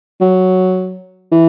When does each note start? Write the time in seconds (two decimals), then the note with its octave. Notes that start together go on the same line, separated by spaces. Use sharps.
0.21 F#3
1.32 E3